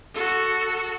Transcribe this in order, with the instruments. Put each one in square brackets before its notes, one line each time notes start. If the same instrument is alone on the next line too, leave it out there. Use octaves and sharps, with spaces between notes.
[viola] F#4 A4